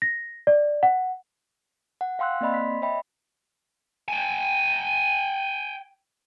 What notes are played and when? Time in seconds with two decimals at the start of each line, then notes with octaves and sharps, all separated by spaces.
0.02 A#6
0.47 D5
0.83 F#5
2.01 F#5
2.19 F5 G5 C6 E6 F#6
2.41 A#3 C4 D5 D#5 B5 C6
2.54 B6
2.82 C#5 D#5 E5 G5 B5
4.08 G5 G#5